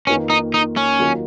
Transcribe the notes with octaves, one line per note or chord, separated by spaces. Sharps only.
F2 D#3 A#3 C#4 F4 B4
D#4
D#4
C#4
D#2 D#3 F#3 A#3 F4